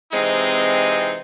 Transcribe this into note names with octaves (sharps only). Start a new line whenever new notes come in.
C3 E3 G#3 C4 D#4